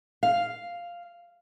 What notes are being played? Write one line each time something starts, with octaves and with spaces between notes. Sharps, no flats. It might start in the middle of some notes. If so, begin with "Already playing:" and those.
F5